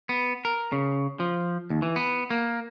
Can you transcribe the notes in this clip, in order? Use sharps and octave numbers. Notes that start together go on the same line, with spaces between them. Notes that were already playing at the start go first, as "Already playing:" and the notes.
B3
A#4
C#3
F3
D#2
E3
B3
A#3